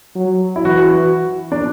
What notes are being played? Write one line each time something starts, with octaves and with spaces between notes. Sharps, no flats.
F#3
E4
E3 F#4
D4